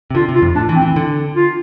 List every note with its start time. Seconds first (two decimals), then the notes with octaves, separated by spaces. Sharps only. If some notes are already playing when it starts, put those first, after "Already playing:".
0.11 C3
0.15 D3 F4
0.29 C3
0.35 F4
0.42 F2
0.55 A2 D4
0.69 E3
0.76 C4
0.82 E3
0.96 D3
1.36 F4